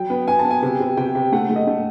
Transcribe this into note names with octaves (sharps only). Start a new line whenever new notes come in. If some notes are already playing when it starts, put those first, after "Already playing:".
Already playing: F#3 G5
B3
B3 G#5
A5
B3
G#5
C3
C3
C3 G5
C3
A3 F#5
A3
D#5
A3